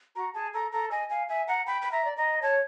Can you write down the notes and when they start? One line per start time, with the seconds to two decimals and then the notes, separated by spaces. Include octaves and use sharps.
0.16 F#4 A#5
0.34 G#4 A5
0.53 A4 A#5
0.72 A4 A#5
0.91 D#5 G#5
1.10 F5 G#5
1.29 E5 G#5
1.48 F#5 A#5
1.66 G5 B5
1.82 B5
1.92 E5 A#5
2.05 D5
2.17 D#5 A#5
2.42 C#5 A5